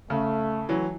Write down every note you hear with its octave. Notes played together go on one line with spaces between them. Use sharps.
C#3 A3
E3 F#3